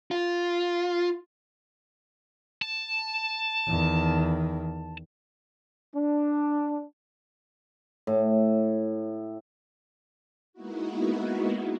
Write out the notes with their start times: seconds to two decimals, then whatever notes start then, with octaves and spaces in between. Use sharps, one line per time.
0.11 F4
2.62 A5
3.67 E2 D#3
5.94 D4
8.07 A2
10.53 G#3 A#3 B3 D#4 E4 F#4